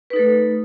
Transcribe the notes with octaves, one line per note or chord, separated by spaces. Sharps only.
A3 D#4 A4 B4